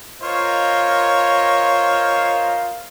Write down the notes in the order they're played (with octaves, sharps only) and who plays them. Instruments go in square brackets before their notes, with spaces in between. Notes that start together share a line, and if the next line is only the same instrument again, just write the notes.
[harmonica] F4 C5 C#5 [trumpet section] A#4 D#5 F5